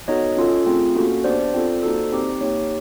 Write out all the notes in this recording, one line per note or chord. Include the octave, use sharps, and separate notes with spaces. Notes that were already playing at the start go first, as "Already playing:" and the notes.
B3 D#4 F#4 A4 C#5 D#5
C#4 F4 A4
A3 C4 F4 G#4
A#3 C#4 F#4 A4
B3 D4 G4 C5 D5
C4 F4 A4
A#3 D#4 F#4 A4
C4 D#4 G4
A#3 D#4 G4 C#5